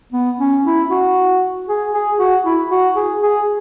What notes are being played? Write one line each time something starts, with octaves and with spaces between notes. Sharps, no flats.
B3
C#4
E4
F#4
G#4
G#4
F#4
E4
F#4
G#4
G#4